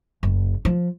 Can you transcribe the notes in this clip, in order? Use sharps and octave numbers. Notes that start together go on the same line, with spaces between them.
F#1
F3